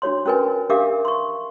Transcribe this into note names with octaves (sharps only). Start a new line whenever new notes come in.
D4 F#4 C#5 C6
C#4 F#4 A#4 B4 G#5
D4 G4 A#4 E5 F5 D6
C6 C#6